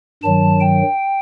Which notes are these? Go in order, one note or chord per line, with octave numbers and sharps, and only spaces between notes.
G2 D#3 F#3 A5
G5